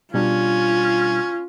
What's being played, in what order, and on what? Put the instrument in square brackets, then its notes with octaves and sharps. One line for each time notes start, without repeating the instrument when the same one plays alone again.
[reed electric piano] B2 G3 D4 [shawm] C#4 [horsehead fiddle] F4